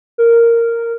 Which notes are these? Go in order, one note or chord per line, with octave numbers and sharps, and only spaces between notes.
A#4